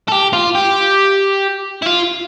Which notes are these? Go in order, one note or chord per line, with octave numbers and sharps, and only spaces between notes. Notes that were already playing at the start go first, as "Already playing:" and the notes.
A4
G4
F4
G4
E4
F4